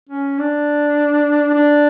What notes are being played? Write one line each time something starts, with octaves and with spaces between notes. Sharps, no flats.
C#4
D4
D4